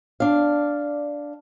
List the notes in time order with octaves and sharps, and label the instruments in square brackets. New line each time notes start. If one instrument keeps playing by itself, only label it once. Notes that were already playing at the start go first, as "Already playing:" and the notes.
[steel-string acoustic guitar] D4 F5